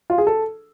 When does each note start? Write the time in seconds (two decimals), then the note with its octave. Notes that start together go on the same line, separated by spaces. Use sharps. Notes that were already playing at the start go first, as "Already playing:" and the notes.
0.10 F4
0.18 G#4
0.27 A4